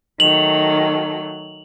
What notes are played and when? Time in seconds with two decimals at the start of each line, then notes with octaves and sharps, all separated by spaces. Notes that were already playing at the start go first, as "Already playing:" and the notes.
0.20 D#3 F#3 A3 F7 F#7